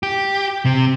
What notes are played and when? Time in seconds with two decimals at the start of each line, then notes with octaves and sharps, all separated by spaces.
0.03 G4
0.66 C3